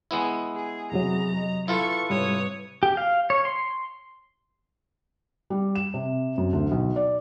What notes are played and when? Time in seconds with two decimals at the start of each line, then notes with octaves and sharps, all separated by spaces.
0.11 G#3 B3 E4
0.56 G#4
0.92 F2 C3 F#3 G#4 A#5
1.36 D#5
1.68 E4 F4 A4 B4 C#6
2.10 G#2 C3 G3 C#5 D#6
2.83 G4
2.97 F5
3.30 C#5
3.45 C6
5.50 G3
5.75 E7
5.94 C3
6.38 F#2
6.53 D2
6.71 B1
6.96 D5